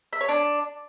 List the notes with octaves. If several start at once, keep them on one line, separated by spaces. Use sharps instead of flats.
E5
C#5
D4